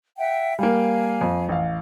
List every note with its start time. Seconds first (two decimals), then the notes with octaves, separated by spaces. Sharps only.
0.18 E5 F#5 G5
0.59 G3 A#3 F5 G#5
1.21 F2
1.49 A1 F5